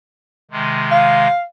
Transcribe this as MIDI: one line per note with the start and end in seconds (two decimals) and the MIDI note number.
0.51 1.27 48
0.51 1.27 51
0.51 1.27 56
0.91 1.43 77